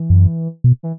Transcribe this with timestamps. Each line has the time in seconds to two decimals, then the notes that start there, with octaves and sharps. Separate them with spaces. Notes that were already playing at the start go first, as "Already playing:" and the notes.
Already playing: E3
0.10 F#2
0.64 B2
0.83 E3